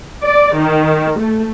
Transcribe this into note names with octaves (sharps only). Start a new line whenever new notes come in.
D5
D#3
A3